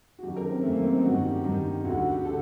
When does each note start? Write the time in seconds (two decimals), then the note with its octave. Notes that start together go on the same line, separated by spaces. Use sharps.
0.19 F#4
0.23 F#2 D#3 G4
0.36 A#4
0.50 C4
0.63 F#2 D#3 A3
0.73 A#3
0.83 C4
0.94 D#4
1.04 G2 D#3 F#4
1.17 F#4
1.31 G4
1.44 G2 D#3
1.85 D2 D3 F#4
1.98 F#4
2.11 G4
2.25 D3 A4